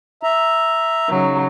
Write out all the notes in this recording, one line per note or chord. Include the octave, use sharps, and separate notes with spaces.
E5 A#5
C#3 F#3 D#4